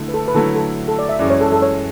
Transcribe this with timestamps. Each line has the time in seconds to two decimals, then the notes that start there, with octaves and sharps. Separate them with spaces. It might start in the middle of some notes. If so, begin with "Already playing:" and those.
Already playing: D3 A3 E4
0.09 B4
0.14 A4
0.28 B4
0.35 D3 F#3 A3 E4 A4
0.56 A4
0.88 A4
0.99 D5
1.09 E5
1.19 F#2 E3 G#3 C#4 D5
1.30 C#5
1.41 A4
1.52 A4
1.62 C#5